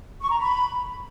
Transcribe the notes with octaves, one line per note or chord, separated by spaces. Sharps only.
C#6
A#5
B5